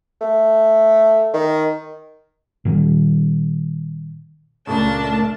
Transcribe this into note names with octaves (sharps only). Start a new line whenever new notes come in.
A3
D#3
A#2 D#3 G3
C#2 A#2 C#3 A3 D4 A#4 A5